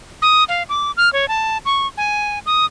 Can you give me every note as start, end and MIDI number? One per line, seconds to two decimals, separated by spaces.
0.22 0.44 87
0.49 0.63 77
0.69 0.91 86
0.97 1.12 89
1.13 1.28 73
1.28 1.58 81
1.65 1.87 85
1.97 2.39 80
2.46 2.65 87